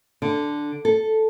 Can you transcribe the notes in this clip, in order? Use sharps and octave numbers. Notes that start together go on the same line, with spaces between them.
D3
A4